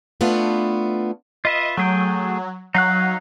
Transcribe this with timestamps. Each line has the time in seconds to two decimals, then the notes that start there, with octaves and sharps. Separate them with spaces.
0.21 A3 B3 D4 E4 F4
1.45 F4 B4 D#5 E5
1.77 F#3 A3 G#4 G5
2.75 F#3 D#4 F5 F#6